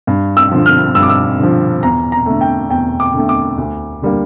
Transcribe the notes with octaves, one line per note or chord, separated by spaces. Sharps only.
G2
E6
D3 F3
F6
G2 E6
D6
E6
D3 F3
E2 A#5
A#5
D3 A3
G5
E2 G5
D6
D3 A3
D6
D2
D3 G3 A#3